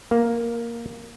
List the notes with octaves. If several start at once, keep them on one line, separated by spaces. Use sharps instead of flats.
A#3